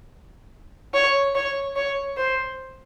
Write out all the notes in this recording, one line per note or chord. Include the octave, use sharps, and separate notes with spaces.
C#5
C#5
C#5
C5